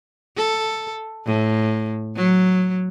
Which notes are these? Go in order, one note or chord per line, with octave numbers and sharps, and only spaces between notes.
A4
A2
F#3